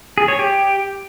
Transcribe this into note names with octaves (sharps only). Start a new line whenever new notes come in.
G#4
C#5
G4